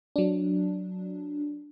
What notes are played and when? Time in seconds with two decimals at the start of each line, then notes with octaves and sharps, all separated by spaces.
0.16 F#3 D4